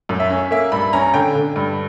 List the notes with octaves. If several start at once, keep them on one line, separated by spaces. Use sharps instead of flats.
F#2
E5
C#4
A#3 E5
G2 B5
C#4 A#5
D3 G5
D3
G2